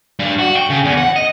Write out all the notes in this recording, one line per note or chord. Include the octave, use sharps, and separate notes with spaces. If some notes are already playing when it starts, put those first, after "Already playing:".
G2
F#4
G5
C#3
E2
F#5
D#5